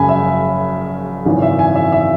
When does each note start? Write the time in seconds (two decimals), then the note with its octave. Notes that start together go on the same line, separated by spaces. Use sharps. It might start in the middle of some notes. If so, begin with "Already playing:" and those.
Already playing: F#1 F#2 C#3 G#3 G#5 B5
0.09 E5
1.26 G#1 F#2 C#3 E3
1.42 E5
1.59 G#5
1.76 E5
1.92 E5